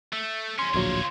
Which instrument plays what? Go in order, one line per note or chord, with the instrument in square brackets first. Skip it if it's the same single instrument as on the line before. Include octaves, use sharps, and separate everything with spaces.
[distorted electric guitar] A3
[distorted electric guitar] E2 C#4 [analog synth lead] C6
[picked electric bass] D1 A#1 F#3 [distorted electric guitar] F4 C#5